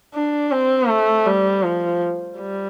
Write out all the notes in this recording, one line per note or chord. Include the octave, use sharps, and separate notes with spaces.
D4
C4
A3
G3
F3
G3